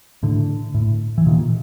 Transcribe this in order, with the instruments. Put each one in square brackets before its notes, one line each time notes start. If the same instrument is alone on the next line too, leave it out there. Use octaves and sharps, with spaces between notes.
[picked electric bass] A2 D3
A2
E3
A#2 D#3